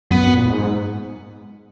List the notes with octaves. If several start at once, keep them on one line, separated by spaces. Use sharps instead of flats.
F#2 B3
F#2
A#2
G#2